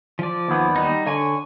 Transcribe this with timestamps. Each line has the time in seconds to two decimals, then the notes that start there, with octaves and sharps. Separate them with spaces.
0.19 F3 D5
0.48 D#2 B3
0.76 G3 D#4
1.06 D3 C#5 G#5 C#6